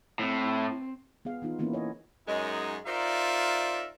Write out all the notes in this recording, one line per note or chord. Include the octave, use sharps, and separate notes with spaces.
A2 C4
B3 G#4 F5
E3 B3 D#4 F4
E3 A#3 B3 C#4 E4
C#5 D#5
F#2 G#3 D#4
D#4 F4 A#4 C5 D5 E5